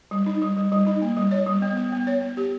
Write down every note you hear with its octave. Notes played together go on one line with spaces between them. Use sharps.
G3
D#4
G3
G3
G3
D#4
A#3
G3
C#5
G3
B3
B3
B3
C#5
B3
G4